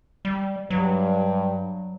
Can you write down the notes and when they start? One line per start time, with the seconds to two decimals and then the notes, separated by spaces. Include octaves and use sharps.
0.25 G3
0.70 G2 F#3